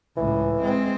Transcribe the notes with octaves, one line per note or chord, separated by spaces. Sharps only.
C#2 A2 E3
G#3 C4